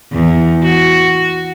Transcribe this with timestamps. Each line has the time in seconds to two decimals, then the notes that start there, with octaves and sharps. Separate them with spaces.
0.12 E2
0.63 F#4